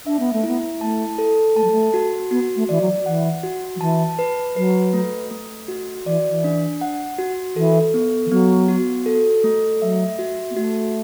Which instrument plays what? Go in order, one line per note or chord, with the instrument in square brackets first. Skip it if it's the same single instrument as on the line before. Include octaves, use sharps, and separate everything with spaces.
[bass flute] D4 [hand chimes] E5
[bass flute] B3
A3
[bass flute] B3 [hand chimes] E4
[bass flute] A3 [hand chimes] A5
[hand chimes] A4
[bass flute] A3 [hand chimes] A5
[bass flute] F#3
A3
[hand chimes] F#4
[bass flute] B3 [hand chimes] F#4
[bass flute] A3
[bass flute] E3 [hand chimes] D5
[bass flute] F#3
[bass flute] E3 [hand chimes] F#5
[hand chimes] F#4
[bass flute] F#3
[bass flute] E3 [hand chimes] A5
[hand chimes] B4
[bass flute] F#3 [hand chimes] B4
[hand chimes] A3
A3
F#4
[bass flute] E3 [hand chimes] D5
[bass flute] E3
[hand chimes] D4
F#5
F#4
[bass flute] E3 [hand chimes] A4
[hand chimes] B3
[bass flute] E3
[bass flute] F#3 [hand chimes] B3
[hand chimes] F#4
A4
A3
[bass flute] F#3 [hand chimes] E5
[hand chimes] F#4
[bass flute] B3
[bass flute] A3 [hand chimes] F#4